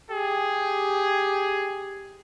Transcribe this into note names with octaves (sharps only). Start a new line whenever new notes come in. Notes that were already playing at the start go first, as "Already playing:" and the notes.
G4 G#4